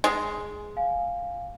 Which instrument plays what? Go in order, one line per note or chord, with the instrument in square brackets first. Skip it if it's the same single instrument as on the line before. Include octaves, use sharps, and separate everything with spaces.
[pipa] G#3 [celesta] G#4
[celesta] F5 G#5